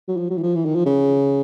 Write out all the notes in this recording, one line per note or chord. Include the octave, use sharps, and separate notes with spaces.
F#3
F3
F#3
E3
F3
E3
D#3
F3
C#3